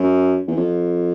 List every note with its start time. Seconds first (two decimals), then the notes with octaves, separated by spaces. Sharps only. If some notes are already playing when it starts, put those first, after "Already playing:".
Already playing: F#2
0.47 E2
0.56 F2